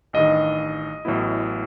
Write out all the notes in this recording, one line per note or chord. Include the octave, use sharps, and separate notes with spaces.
A1 G2 D#3 D#5
A1 A2 F#3 B3 E4